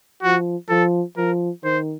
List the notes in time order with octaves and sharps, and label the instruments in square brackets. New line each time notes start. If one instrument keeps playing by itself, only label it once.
[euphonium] F3 [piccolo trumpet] F#4
[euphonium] F3 [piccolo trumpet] A4
[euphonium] F3 [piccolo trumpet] A#4
[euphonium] D#3 [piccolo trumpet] C5